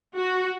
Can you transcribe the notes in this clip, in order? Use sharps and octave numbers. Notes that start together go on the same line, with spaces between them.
F#4